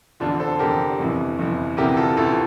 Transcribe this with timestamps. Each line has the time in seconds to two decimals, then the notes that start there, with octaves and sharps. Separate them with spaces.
0.20 F1 E2 D3 D4 F4
0.40 A4 C5
0.59 F1 E2 D3 G4 A#4
0.99 G1 F2 C3 E3
1.38 G1 F2 C3 E3
1.77 D2 C3 E3 G4 A#4
1.97 F4 A4
2.17 D2 C3 E3 F4 A4